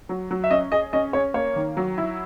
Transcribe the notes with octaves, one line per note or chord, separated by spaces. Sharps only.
F#3
F#3
E5
C#4 D#5
G#4 D#5
C#4 D#5
C#4 C#5
A#3 C#5
D#3
F#3
E4